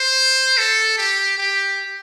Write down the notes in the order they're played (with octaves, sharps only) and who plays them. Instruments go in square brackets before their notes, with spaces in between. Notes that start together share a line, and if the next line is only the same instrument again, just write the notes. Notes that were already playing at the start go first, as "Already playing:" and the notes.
Already playing: [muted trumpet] C5
A4
G4
G4